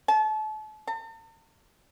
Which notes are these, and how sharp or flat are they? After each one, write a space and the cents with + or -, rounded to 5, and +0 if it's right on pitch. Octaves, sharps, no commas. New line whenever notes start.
A5 -35
A5 +45